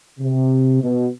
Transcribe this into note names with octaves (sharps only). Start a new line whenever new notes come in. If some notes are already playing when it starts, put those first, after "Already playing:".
C3
B2